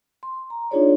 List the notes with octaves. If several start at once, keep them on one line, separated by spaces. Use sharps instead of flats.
C6
A#5
D4 D#4 F4 G#4 C#5 D5